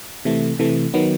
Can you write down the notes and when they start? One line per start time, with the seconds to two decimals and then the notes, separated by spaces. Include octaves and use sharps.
0.25 C3 E3 A3
0.59 C3 E3 A3
0.94 D#3 F#3 B3